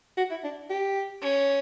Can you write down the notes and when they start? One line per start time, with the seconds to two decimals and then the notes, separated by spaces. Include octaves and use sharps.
0.17 F#4
0.31 E4
0.44 D4
0.70 G4
1.22 C#4